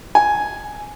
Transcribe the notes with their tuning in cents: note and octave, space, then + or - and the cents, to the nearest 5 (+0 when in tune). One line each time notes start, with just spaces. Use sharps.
G#5 +5